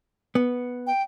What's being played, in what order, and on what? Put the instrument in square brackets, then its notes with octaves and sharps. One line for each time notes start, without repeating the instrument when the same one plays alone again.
[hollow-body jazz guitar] B3
[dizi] G5